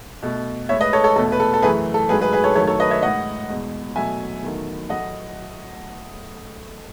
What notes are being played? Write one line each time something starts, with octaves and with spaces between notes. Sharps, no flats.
B2 A3
A2 G#3 C#5 E5
B4 D#5
A4 C#5
A4 C#5
E2 B2 A3 A4
B4
A4
A4
F#2 E3 A3 G#4 B4
A4
G#2 F#3 A3 G#4 B4
G#4 B4
G#4 B4
A4 C#5
F#2 D#3 F#3 A3 A4 C#5
A4 C#5
B4 D#5
C#5 E5
A2 G#3 D#5 F#5
E2 B2 G#3
B2 F#3 A3 E5 G#5
E2 D#3 F#3 A3
A2 F#3 A3 D#5 F#5